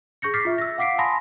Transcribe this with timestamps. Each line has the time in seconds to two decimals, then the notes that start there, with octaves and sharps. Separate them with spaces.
0.22 G#4 C#6 G6 A#6 C#7
0.34 D6 F6 A6 B6 C7
0.45 F4 E5
0.58 E6 A#6
0.78 F5 F#5 D6 B6 C7 D7
0.98 G#5 A5 B5 C6 D#6 A#6